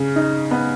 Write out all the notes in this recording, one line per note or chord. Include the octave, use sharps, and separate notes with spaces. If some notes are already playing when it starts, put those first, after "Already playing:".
Already playing: C#3
D#4
B3